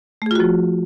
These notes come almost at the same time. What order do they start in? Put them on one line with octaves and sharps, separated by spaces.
A3 G#4 F4 F#4 F3